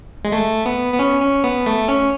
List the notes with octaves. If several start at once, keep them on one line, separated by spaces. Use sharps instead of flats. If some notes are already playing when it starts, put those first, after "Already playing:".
G#3
A3
B3
B3
C#4
C#4
B3
A3
C#4